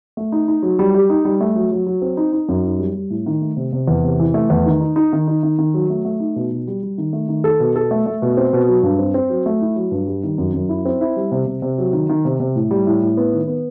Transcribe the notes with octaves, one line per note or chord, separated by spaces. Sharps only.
A3
D#4
D#4
F#3
G3
G4
D#4
G3
A3
F#3
F#3
F#3
C4
D#4
D#4
F#2
D#4
G3
G3
A2
D#3
A3
C3
C3
E2
C3
E3
A3
E2
D#3
D#4
D#4
D#3
D#4
D#3
D#3
F#3
A3
A3
D#4
B2
B2
G3
G3
D#3
A3
D#3
A4
B2
A4
A3
A3
B2
C4
B2
F#3
G2
C4
C4
F#3
A3
E4
F#3
G2
G3
D#3
F#2
F#2
E4
C4
E4
G3
C3
C3
C3
F#3
D#3
D#3
C3
C3
A2
G3
A2
A2
B3
D#3
B3